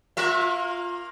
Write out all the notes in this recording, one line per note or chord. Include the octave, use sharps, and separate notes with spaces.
A#3 F4 E5